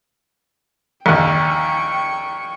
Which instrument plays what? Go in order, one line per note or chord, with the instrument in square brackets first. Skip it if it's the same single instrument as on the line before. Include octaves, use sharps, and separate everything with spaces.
[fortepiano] A#1 D#2 [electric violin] G5 C#6